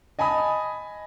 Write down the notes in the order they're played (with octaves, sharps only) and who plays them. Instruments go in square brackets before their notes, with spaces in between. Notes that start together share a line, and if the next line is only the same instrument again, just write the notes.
[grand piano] D#5 G#5 A5 B5 D#6